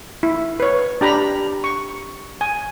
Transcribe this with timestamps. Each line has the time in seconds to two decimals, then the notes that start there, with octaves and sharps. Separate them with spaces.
0.23 E4
0.60 B4 C#5
1.01 D4 G4 A#5 B5
1.64 C#6
2.41 G#5